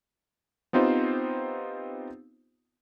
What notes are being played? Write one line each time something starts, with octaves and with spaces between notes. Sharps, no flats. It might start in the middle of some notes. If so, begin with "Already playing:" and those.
B3 C4 D#4 F4 G4 C5